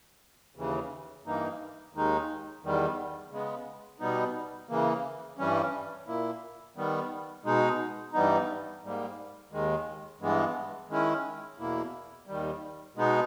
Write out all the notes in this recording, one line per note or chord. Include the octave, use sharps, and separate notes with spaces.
D#2 C#3 E3
G2 E3 A#3 D#4
D#2 D#3 G#3 D#4
E2 D#3 G3
C#3 G#3 B3
B2 G3 B3 D#4
C#3 E3 A#3
G2 E3 G3 C#4
A#2 A#3 E4
D#3 G3 B3
B2 G#3 D#4
G2 E3 G3 B3 D#4
G#2 G3 A#3
D#2 D#3 G#3
G2 E3 G#3 B3
D#3 G#3 C#4 E4
E2 B2 A#3 E4
D#2 D#3 G3
B2 G#3 B3 D#4